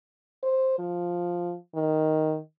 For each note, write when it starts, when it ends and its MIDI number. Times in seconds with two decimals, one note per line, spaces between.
0.43 0.75 72
0.79 1.55 53
1.75 2.37 51